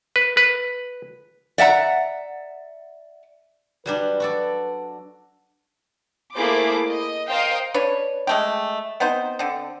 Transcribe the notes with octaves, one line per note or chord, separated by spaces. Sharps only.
B4
B4
D5 E5 F#5 A#5
F#3 G3 D4 B4
F#4 A4 D5
A3 A#3 E4 G#4 C5 D6
D#5
A#4 C5 D#5 F5 G5
C#4 D4 B4 C#5
G#3 A3 G4
B3 C4 D#4 C5
D3 C4